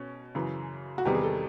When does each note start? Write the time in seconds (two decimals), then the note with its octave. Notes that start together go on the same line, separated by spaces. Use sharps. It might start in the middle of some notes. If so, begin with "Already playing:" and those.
Already playing: B2 C#4 C#5
0.35 F#2 C#3 E3
0.98 F#4
1.05 E2 C3 D#3 G3 B3 G4
1.15 G#4
1.23 A4